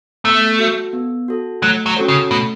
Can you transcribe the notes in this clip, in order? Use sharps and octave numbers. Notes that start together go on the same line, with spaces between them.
A3 B3
F#4 A4
B3
F#4 A4
F#3 A3
F#3
C#4 F#4 A4 C#5
C#3
B2 A3